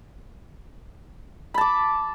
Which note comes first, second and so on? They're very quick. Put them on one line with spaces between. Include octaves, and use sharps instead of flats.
B5 A5 D6